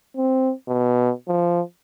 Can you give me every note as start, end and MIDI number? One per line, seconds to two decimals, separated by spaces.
0.17 0.52 60
0.68 1.11 47
1.28 1.61 53